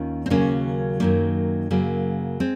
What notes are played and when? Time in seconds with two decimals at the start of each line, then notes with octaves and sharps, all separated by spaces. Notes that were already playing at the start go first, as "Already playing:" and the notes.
Already playing: D#2 D#3 C#4 F4
0.26 C4
0.30 D#2 C#3 F#3 A#3 C#4
1.00 F#2 D#3 F#3 A#3
1.70 F#2 C#3 F#3 A#3
2.40 G#3 C4